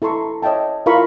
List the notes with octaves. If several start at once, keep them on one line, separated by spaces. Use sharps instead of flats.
E4 A4 A#5 C6 C#6
C#5 D#5 E5 G5 A5
E4 F4 A#4 F5 B5 C#6